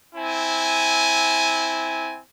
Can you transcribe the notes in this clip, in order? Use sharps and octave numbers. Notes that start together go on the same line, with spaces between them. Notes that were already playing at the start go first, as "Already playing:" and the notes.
C4 E4 G#5